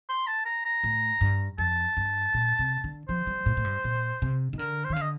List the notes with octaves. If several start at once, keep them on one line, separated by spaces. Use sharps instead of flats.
C6
A5
A#5
A#5
A2
G2
F2 A5
G2
A#2
C3
D3
F3 C5
G3
A2
A2
G2
A#2
C3
D#3
D3 A#4
C5
D#3
F5
D3
D#5